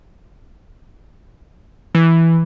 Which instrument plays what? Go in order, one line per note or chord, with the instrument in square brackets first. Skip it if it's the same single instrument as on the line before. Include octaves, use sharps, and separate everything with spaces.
[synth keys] E3